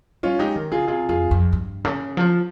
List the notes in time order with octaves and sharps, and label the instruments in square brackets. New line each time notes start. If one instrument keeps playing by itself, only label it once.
[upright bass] G3 [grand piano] C#4 F4
[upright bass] G#3 [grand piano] D#4 G4
[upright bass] D#3
[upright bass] C#3 [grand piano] F4 G#4
[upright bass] C3 [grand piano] F4 G#4
[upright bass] F2 [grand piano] F4 G#4
[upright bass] F2
G2
C#3
F3